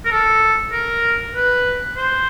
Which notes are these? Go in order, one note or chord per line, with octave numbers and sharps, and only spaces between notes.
A#4
A4
A#4
B4
C5